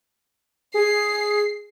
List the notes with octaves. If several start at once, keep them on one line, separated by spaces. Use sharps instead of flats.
G#4 C7